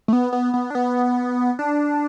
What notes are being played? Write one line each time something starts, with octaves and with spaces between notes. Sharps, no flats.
A3
B3
B3
B3
D4
B3
D4